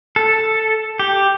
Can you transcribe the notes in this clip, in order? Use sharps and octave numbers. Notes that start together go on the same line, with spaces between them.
A4
G4